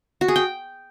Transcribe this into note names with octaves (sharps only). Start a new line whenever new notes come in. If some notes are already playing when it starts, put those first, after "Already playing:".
F#4
G#4
G5